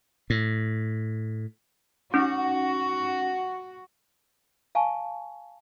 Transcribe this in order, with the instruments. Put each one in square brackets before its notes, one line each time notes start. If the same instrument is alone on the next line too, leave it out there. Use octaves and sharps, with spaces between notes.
[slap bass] A2
[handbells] C#4 D#4 [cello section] F#4
[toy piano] F5 G#5 A5 C#6